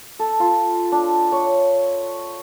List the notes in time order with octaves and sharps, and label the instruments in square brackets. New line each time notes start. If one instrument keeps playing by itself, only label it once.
[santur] A4
F4
D4
C#5